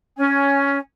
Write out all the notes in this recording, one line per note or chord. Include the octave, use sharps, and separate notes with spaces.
C#4 G#5